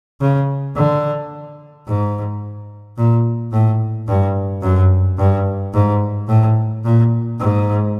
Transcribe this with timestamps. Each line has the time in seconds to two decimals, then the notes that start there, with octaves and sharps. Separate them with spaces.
0.21 C#3
0.76 D3
1.87 G#2
2.97 A#2
3.52 A2
4.08 G2
4.63 F#2
5.18 G2
5.74 G#2
6.28 A2
6.85 A#2
7.40 G#2